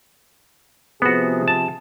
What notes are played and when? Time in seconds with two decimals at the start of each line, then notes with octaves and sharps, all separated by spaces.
1.02 C3 F3 B3 F#4 G#4
1.48 A5